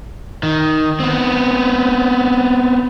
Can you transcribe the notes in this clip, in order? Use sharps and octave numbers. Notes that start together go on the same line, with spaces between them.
D#3
B3 C4